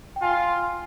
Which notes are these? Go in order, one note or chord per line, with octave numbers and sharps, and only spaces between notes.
G5
F4 G#5